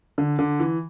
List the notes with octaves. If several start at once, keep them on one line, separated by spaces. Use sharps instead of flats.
D3
D3
E3